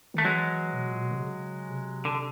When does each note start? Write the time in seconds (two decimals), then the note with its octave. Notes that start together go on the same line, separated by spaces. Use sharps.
0.14 D#3 A3
0.25 E3 F#3 G#3
0.73 B2
0.92 A#2
1.02 B2
1.11 C3
1.21 C#3
1.69 C3
2.05 D3